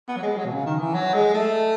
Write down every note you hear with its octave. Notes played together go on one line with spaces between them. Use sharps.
B3
F#3
G#3
F#3
B2
C#3
D#3
E3
F#3
G#3
A3